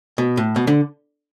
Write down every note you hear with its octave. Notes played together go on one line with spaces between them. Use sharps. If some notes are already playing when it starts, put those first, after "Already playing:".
B2
A2
B2
D3